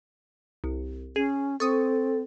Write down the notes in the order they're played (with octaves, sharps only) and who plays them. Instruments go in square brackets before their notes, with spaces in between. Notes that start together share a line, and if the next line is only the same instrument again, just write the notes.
[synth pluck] C2
[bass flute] C#4 [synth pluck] G#4
[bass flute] C4 [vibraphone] A4 [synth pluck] C#6 D#6